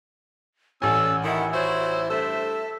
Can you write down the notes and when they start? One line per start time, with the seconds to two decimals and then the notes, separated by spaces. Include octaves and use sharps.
0.82 A1 C#3 C#4 A4 D5 G#5 E6
1.24 D#3 E4 F#5
1.53 E4 F#4 C5 C#5
2.10 G2 A3 A4 C5 E5